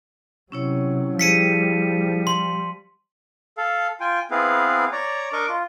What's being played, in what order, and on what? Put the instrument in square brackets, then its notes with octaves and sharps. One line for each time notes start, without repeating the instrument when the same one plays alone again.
[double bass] C3 F#3 [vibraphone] C#4 E4 C#5
[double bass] F3 G3 [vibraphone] E4 G#4 C5 [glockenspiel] B6 C#7 D#7
[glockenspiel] C6
[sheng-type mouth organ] A4 F5
F4 G5 G#5
B3 C4 E4 G#4 B4 F5
C#5 D5 A#5
D4 A#4 D#5 C#6 D6
F4